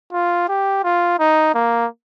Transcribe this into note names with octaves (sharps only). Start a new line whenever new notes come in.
F4
G4
F4
D#4
A#3